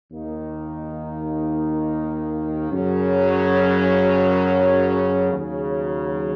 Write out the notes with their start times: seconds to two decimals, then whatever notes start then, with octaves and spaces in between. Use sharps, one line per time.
0.11 D#2 D#3 A#3 D#4
2.71 F#2 C#3 F#3 C#4
5.32 D#2 C#3 F#3